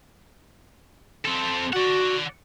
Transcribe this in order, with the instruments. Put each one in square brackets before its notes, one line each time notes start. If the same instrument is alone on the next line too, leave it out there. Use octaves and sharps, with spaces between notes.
[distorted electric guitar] C4 A4
[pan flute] F#4 [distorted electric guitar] D5 F#5